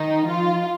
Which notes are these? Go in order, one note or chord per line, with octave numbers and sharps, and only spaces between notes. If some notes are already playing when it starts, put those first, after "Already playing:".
Already playing: D#3 D#4
F3 F4